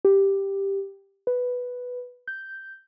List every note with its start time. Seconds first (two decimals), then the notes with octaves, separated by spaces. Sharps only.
0.05 G4
1.27 B4
2.27 G6